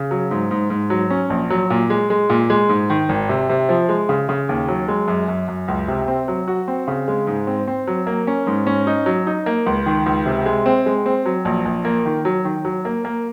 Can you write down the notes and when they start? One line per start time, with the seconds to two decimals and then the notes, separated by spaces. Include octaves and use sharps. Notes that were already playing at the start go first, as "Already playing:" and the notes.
Already playing: C#3
0.11 F#3
0.31 G#2
0.51 G#2
0.70 G#2
0.90 F#3
1.10 C#4
1.30 A#1
1.50 F#3
1.70 A#2
1.90 G#3
2.10 G#3
2.30 A#2
2.50 G#3
2.69 G#2
2.90 D#3
3.09 G#1
3.29 C3
3.49 C3
3.69 F3
3.89 G#3
4.09 C#3
4.29 C#3
4.49 D#2
4.68 F#3
4.88 G#3
5.08 F#2
5.28 F#2
5.48 F#2
5.68 C#2
5.88 C3
6.08 C4
6.28 F#3
6.48 F#4
6.68 C4
6.88 C#3
7.08 G#3
7.27 G#2
7.47 C4
7.68 C4
7.87 F#3
8.07 A#3
8.27 C#4
8.47 G#2
8.67 C#4
8.87 D#4
9.06 F#3
9.27 D#4
9.46 A#3
9.66 C#2
9.86 D#3
10.06 C#2
10.26 C3
10.46 G#3
10.66 C4
10.86 G#3
11.06 C4
11.26 F#3
11.45 A#1
11.65 A#1
11.85 A#3
12.05 D#3
12.25 F#3
12.45 D#3
12.65 F#3
12.85 A#3
13.05 A#3